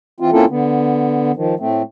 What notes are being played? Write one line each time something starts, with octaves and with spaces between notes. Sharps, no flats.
E3 C4 F4
A#3 C4 C#4 E4 F4 A4
D3 B3
D#3 F3
A2 A3 C4